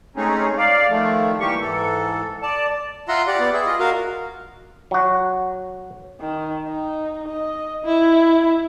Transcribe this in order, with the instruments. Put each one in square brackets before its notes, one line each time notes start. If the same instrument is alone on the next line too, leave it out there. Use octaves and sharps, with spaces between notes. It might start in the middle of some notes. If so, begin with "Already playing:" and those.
[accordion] G#3 A3 C4 C#4 D#4 G#4
D5 F5
D#3 F3 A3
E3 G3 A#3 G4 C#6
G#2 E3 A4
D5 A5
[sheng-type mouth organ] F4 E5 F#5 A#5 C6
G4 D5 F#5
B3 D5
G#4 E5
F4 D#5
F#4 A#4 F5
[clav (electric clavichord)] F#3 F#4
[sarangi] D#3
D#4
D#5
E4